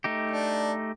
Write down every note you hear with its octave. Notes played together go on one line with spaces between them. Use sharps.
A3 D#4 G4
D4